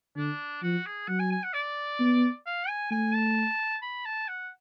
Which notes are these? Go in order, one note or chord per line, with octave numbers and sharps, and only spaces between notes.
D3 D4
F3 F#4
G#4
F#3 F#5
G#5
G#5
F#5
D5
B3
F5
G#5
A3 G#5
A5
B5
A5
F#5